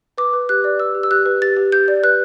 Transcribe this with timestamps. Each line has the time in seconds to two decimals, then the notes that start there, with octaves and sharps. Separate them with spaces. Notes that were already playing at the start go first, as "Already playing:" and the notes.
0.18 B4 D6
0.33 B4
0.49 G4 F#6
0.64 D5
0.80 B4 E6
0.95 G4
1.03 E6
1.11 G4 F#6
1.26 B4
1.42 G4 A6
1.57 G4
1.72 G4 G6
1.88 D5
2.03 B4 F#6